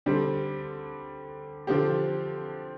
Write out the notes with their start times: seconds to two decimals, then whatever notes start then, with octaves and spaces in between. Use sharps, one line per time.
0.06 D3 G3 C4
1.67 D3 F3 C4 G4